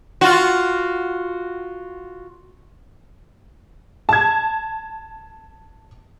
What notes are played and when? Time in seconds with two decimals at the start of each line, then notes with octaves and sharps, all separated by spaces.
0.21 F4 F#4
4.09 A5 G#6